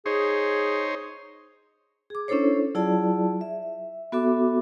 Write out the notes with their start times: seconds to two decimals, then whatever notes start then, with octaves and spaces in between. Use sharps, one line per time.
0.06 D#4 G#4 C5 C#5
2.10 G#4 D6
2.28 C#4 D4 E4 A4 C5 C#5
2.75 F#3 E4 F4 G#4 D5 A5
3.41 E5
4.12 B3 F#4 A4 E5 D6